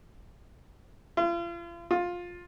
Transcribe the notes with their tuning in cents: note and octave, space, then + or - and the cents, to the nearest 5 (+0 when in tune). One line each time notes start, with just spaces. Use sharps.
F4 -40
F4 +15